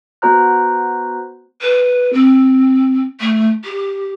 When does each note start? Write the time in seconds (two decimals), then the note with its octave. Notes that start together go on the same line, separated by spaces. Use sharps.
0.22 B3 F#4 C5 A#5 F#6
1.61 B4
2.13 C4
3.20 A3
3.65 G4